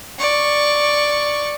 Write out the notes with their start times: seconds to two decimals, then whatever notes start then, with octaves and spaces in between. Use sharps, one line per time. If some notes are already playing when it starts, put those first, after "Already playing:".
0.19 D5 C#6